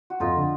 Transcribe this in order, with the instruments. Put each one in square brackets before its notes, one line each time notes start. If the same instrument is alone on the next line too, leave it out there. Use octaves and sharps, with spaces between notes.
[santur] F#4
[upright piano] F2 [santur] D#4 F4
[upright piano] D3